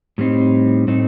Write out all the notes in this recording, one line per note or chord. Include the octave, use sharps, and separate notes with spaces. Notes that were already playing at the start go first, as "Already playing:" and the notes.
A2 G3 C4 D#4
A2 A3 C4 D#4